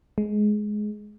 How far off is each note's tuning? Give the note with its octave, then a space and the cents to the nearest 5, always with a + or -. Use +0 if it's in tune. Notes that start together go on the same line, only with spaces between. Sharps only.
G#3 +15